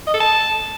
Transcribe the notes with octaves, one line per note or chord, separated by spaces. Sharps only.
D#5
A4
A5